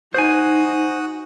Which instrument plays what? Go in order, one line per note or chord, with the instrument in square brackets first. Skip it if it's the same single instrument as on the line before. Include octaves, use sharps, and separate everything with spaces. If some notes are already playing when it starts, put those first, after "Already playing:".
[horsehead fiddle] D#4 [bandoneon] F#4 D#6 F#6 [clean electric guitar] C5 G#5